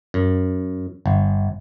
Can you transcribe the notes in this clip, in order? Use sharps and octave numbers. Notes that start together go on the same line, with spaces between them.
F#2
G1